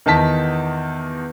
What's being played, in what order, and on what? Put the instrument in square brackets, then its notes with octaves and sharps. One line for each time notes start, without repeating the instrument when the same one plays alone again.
[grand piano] E2 D#3 A5 B6